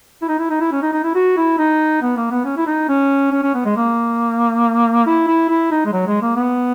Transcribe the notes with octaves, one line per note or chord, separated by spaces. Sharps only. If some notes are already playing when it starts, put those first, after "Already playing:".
E4
D#4
E4
D#4
E4
C#4
D#4
D#4
E4
F#4
E4
D#4
B3
A#3
B3
C#4
E4
D#4
C#4
C#4
C#4
B3
G#3
A#3
E4
E4
E4
D#4
G#3
F#3
G#3
A#3
B3